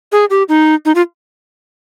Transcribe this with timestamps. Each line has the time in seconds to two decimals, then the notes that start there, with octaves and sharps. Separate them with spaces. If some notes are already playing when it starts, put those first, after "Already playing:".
0.12 G#4
0.30 G4
0.49 D#4
0.85 D#4
0.95 F4